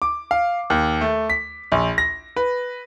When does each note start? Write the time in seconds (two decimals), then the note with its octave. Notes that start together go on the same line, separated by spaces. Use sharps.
0.02 D6
0.31 F5
0.70 D#2
1.01 A3
1.30 B6
1.72 A#1
1.98 A#6
2.36 B4